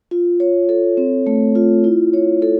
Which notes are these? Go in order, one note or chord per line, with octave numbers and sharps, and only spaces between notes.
F4
C#5
A4
C4
A3
F4
E4
C#5
A4